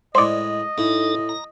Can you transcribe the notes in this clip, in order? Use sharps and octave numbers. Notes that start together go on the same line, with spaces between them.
A2 G#3 C5 D5 D#5
A2 D#4 A4
A#5